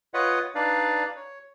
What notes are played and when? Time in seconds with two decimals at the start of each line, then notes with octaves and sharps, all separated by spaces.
0.14 F4 B4 C#5 D#5 F#5
0.55 D4 D#4 B4 D5 F5
1.16 C#5